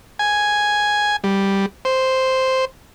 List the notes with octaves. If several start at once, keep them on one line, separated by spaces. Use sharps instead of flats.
G#5
G3
C5